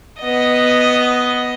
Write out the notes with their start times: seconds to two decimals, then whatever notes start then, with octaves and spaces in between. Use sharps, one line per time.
0.20 B3 D#5